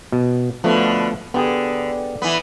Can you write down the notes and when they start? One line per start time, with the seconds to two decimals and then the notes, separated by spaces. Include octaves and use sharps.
0.12 B2
0.64 B2 D3 F3 A3 B3
1.34 D3 B3 G4 G#4
2.22 E3 B3